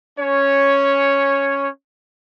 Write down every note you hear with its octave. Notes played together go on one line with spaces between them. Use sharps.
C#4 C#5